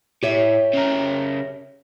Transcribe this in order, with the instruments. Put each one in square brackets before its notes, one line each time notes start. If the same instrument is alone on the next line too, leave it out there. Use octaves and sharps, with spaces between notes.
[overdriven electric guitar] A2 [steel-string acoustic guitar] G4 C#5 E5
[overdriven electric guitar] C#3 A#4